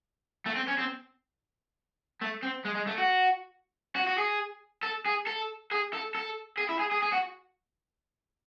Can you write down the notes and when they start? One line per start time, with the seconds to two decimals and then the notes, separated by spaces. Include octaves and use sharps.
0.46 A3
0.56 C4
0.68 C#4
0.79 C4
2.21 A3
2.42 C4
2.65 G#3
2.75 G#3
2.87 A3
2.98 F#4
3.96 F#4
4.07 F#4
4.18 G#4
4.83 A4
5.06 G#4
5.27 A4
5.71 G#4
5.93 A4
6.15 A4
6.58 G#4
6.69 E4
6.80 G#4
6.92 G#4
7.03 G#4
7.13 F#4